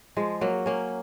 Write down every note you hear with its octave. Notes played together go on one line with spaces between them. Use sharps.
F3 G#3
F#3 A#3
A#3 C#4